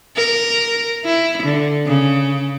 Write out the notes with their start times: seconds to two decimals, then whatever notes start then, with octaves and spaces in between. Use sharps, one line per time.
0.16 A#4
1.05 E4
1.44 D3
1.86 C#3